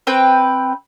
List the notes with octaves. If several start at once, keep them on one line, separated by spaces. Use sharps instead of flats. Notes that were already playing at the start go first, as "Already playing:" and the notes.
C4 B4 G5